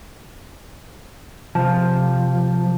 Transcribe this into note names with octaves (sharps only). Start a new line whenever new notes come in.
C3 F3 F4 A5